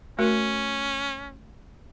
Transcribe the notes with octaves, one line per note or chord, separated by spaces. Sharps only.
A3 C#4 F#4 A#4